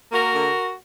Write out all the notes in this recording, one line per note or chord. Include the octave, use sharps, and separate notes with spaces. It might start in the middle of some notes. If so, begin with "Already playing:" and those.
A#3 F#4 A#4
D3